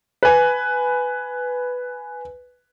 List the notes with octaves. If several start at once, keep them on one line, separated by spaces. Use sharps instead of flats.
B4 G#5